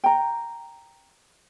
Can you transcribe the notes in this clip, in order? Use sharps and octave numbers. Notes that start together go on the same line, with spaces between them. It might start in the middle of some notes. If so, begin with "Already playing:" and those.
G5 A#5